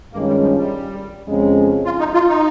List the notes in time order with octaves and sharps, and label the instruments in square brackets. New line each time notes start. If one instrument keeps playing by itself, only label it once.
[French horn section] G2 D#3 G#3 C#4 F4 [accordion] A#3
[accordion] G3
F3
G3
[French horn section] F2 C#3 G#3 C#4
[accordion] F4
D#4
F4
D#4